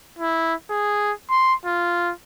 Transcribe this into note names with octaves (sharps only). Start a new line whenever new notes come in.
E4
G#4
C6
F4